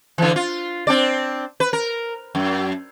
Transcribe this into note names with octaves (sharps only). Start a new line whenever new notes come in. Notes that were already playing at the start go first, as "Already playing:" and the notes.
D3 E3
F4
C4 D4 D5
B4
A#4
F#2